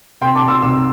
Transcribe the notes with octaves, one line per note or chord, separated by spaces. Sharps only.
C3 G5 C6
A5 D6
C3
C6 E6
C2 C6 E6